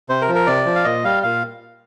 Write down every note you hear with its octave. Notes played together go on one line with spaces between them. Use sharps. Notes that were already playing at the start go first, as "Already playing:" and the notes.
C3 C5
A#4
F3
A#4
C3 D5
F3
F5
A#2 D#5
G3 F5
A#2 F5